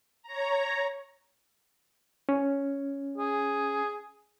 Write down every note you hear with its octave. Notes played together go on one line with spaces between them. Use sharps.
C#5 A#5
C#4
G#4